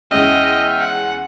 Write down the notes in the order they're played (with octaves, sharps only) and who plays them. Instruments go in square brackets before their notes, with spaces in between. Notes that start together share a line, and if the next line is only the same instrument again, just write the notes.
[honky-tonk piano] E2 G#3 C#4 [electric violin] D#5 [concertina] E5 G5 F6
[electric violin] F#5